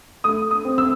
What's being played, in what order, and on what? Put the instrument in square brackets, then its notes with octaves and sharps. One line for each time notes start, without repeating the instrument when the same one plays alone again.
[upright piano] A3 D#6
D#6
C4
E6